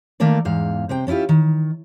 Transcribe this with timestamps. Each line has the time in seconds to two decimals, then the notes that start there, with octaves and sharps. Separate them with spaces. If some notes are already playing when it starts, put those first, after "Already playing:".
0.20 D#3 A3 A#3 A#4 D5
0.45 E2 G#2 F5
0.89 C3 C5 G5
1.07 C#4 D4 E4 F4 G4
1.29 D#3